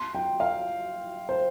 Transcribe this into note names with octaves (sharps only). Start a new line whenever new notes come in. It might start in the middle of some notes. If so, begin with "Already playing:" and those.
Already playing: C6
G5
F5
C5